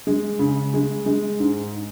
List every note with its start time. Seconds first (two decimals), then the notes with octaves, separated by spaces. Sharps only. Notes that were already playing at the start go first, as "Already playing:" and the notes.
0.07 G#3
0.39 C#3
0.74 G#3
1.06 G#3
1.40 G#2